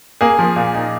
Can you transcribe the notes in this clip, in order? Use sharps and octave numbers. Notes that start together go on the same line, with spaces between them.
A#3 G#4
F3
A#2
D#4